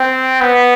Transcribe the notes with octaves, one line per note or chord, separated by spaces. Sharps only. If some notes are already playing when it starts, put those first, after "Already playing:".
Already playing: C4
B3